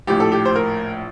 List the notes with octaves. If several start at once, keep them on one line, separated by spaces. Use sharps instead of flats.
A#1 A2 G4
A4
G4
C5
A#4